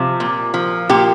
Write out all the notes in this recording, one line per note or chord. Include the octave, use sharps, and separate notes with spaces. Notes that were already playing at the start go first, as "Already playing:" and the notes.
Already playing: C3 F3
A#2
F3
A#2 G4